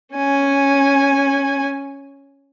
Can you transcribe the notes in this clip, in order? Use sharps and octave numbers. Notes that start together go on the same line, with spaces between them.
C#4 G#5